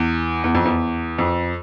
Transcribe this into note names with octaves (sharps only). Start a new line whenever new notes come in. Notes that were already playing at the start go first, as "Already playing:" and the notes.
Already playing: E2
E2
F2
E2
F2